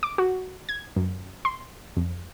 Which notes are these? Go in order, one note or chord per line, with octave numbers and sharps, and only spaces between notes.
D6
F#4
G#6
F#2
C6
F2